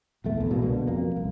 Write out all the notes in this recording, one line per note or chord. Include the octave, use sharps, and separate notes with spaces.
B1 E2 A3
A#1 E2
C2 B2 G#3 A#3
B2 D3
F2 A#3
C2